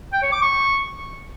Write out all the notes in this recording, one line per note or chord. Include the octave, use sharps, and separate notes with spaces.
G5
C#5
D6
C#6